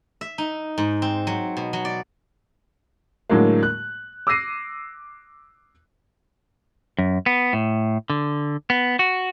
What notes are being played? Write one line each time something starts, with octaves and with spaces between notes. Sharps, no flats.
E5
D#4
G#2
C4
F#3
B2
F#3
D5
A2 D3 F#3 G#3 A#3
F#6
D6 E6 F#6 A#6 C7 D#7
F#2
B3
A2
D3
B3
F#4